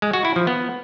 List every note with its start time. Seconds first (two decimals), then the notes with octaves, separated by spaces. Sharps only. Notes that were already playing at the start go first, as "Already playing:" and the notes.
0.02 G#3
0.13 F#4
0.25 E4
0.36 F3
0.47 B3